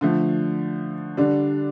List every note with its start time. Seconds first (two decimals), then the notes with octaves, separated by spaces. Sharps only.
0.01 D3 F3 A3
1.17 D3 G3 D4